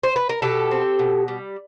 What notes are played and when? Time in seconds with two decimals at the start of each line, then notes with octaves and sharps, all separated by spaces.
0.03 C5
0.16 B4
0.29 A#4
0.42 B2 G4 A4
0.71 C4
0.99 B2
1.28 G3